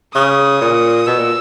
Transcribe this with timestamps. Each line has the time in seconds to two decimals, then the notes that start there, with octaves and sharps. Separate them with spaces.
0.15 C#3 D#6
0.61 A#2
1.06 B2 E6
1.19 A#2